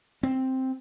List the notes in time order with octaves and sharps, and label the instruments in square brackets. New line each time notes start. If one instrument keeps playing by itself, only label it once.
[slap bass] C4